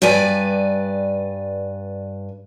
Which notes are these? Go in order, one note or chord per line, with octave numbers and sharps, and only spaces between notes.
G2 B4 D5 G#5